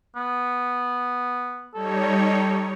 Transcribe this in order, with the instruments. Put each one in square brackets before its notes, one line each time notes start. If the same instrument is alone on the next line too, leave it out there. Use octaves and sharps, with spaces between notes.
[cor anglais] B3
[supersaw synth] G3 D#4 C#5 [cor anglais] A4